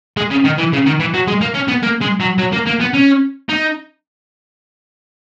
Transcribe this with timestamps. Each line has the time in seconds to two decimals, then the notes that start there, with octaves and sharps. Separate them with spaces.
0.17 G#3
0.30 C#3
0.44 D#3
0.58 E3
0.72 C#3
0.86 D#3
1.00 E3
1.14 F#3
1.27 G#3
1.41 A#3
1.55 C#4
1.69 B3
1.83 A#3
2.01 G#3
2.20 F#3
2.38 F#3
2.52 A#3
2.66 A#3
2.80 B3
2.93 C#4
3.49 D#4